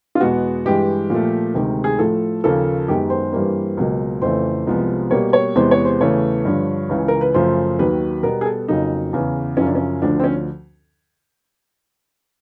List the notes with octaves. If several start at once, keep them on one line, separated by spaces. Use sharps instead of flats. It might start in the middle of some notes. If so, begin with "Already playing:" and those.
F4
E2 B2 G#3 B3 F#4
G2 E3 G#3 G4
A#2 F3 A3
D2 C3 D#3 G#3
G#4
A2 F3 A3 A4
D#2 C#3 F3 A#3 A4
F#2 D#3 G#3 B3 G4
C5
G2 E3 G3 A#3
C#2 B2 F#3 A#3
F2 C#3 E3 A3 C5
C2 C3 F3 G#3 B3
B2 G3 A#3 C#5
C#5
E2 C3 E3 G#3 B3 C5
C#5
C5
E2 C#3 E3 A3 C#5
G2 D3 F3
C#2 C#3 E3
A#4
B4
F#2 C#3 F3 A3 C5
D#2 D#3 F#3 B4
B2 G3 B3 A#4
G#4
A4
F2 C#3 F#3 A#3 D#4
E2 C#3 E3
F#2 C#3 F3 C#4
D4
C#4
D2 D3 F3 D4
C4
C#4